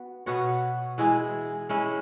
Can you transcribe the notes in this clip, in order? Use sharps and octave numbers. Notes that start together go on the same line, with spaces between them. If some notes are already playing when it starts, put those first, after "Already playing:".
Already playing: B3 F#4
B2 B3 F#4 C#5
E3 G#3 E4 G#4
G#3 C#4 E4